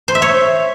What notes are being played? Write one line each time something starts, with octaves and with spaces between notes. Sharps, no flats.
C5
E5
C#5